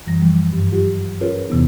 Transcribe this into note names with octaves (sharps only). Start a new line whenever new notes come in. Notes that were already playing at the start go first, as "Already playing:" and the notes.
F#2 E3 G3 A#6
E3 F3 G3
G2
F#3 F4 G4
C#4 F4 G#4 A#4 B4 C#5
E2 C3 E3 B3 D#4